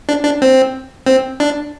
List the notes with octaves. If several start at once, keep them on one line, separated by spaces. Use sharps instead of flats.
D4
D4
C4
C4
D4